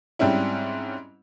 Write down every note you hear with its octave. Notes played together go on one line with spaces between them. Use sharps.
G#2 G3 C4 C#4 E4